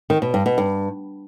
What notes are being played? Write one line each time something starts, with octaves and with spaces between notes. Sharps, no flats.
D#3
B2
G2
B2
G2